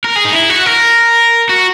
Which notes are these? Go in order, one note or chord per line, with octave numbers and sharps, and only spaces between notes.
A#4
G#4
D#4
E4
F#4
A#4
F#4